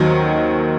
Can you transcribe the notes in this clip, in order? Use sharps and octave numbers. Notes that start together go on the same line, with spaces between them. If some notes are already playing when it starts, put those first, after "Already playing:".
Already playing: D#2 D#3 F#3 C5